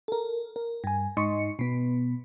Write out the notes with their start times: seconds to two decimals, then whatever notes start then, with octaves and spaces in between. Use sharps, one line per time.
0.08 A4 A#4
0.56 A#4
0.84 G2 G#5
1.17 G#2 D#4 D#5 C6 C#6 C#7
1.59 B2 B3